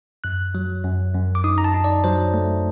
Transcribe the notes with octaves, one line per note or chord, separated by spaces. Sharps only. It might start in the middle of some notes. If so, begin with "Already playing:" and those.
F#2 F#6
F#3
F#2
F#2
D6
D#4 D#6
A#5
A5
D#4
D5
F#3 C5
A3